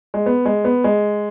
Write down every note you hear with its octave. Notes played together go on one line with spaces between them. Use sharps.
G#3
B3
G#3
B3
G#3